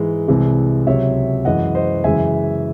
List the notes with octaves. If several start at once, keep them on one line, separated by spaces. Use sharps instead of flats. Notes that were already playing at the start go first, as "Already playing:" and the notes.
Already playing: G#2 E3 G#3
C2 C3 E3 G#3
C#2 C3 F#3 C#5 E5
F#2 E3 G#3 D#5 F#5
C5 D#5
F#2 C#3 E3 G#3 E5 G#5